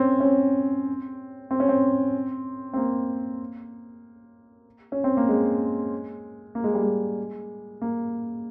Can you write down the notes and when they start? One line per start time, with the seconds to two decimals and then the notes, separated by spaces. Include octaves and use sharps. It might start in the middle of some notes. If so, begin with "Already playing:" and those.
Already playing: C4 C#4
0.20 C#4
0.25 C4
1.51 C4
1.60 C#4
1.69 C4
2.73 C4
2.77 A#3
4.92 C#4
5.04 C4
5.17 A#3
5.29 G#3
6.55 A#3
6.64 G#3
6.74 G3
6.83 G#3
7.82 A#3